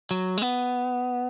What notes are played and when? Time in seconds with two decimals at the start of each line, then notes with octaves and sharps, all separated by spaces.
0.11 F#3
0.37 G#3
0.42 B3